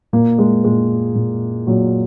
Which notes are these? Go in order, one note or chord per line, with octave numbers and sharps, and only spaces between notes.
A#2 A#3
G#3
A#2 G#3
A#2
A#2 F#3